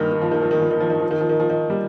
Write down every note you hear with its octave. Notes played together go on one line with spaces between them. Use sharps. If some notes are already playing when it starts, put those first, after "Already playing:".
Already playing: G2 A#2 D#3
D#3
F3
D#3
F3
D#3
F3
D#3
F3
D#3
F3
D#3
F3
D#3
F3
D#3
G3